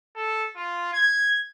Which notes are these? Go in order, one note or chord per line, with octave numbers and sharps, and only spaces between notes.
A4
F4
G#6